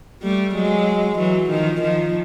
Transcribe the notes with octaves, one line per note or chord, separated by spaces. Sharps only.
G3 A3
F#3 G#3
E3 F#3
D#3 F3
D#3 F3